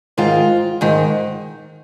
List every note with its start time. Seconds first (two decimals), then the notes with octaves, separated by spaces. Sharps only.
0.18 G#2 D#3 F4
0.81 G#2 D#3